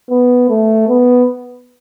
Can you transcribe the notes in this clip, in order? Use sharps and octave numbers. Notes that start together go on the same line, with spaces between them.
B3
A3
B3